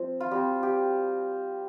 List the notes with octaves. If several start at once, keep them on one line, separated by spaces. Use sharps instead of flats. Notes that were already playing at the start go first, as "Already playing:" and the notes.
Already playing: F3 C4
F4
G3 C4 F4 G4
G4